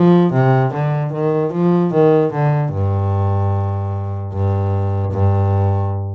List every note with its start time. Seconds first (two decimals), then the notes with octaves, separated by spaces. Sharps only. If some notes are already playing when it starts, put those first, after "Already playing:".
Already playing: F3
0.33 C3
0.74 D3
1.13 D#3
1.53 F3
1.94 D#3
2.33 D3
2.73 G2
4.33 G2
5.12 G2